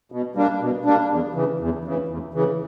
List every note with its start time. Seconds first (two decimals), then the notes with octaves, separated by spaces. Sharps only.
0.12 B2
0.36 G3 A#3 D4
0.61 B2
0.85 G3 A#3 D4
1.10 E2
1.34 C#3 E3
1.60 E2
1.85 C#3 E3
2.08 E2
2.34 C#3 E3